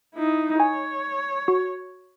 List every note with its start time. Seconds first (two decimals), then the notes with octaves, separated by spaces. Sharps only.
0.14 D#4 E4
0.60 C#5 G#5
1.48 F#4